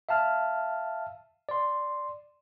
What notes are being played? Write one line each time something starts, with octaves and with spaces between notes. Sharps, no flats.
E5 F5 A5 F6
D5 C6